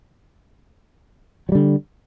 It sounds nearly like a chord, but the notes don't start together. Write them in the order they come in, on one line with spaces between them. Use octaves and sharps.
F#3 G3 D3